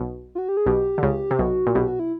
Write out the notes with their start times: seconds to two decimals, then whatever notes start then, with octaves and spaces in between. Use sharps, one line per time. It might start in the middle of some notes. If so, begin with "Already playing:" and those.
Already playing: B1 B2
0.35 F4
0.38 F#4
0.49 G4
0.57 G#4
0.66 B1 B2 G4
0.98 D3
1.03 C#2 C#3
1.31 C3
1.39 B1 B2 F#4
1.67 A#2
1.75 B1 B2 G4
1.88 F#4
1.99 E4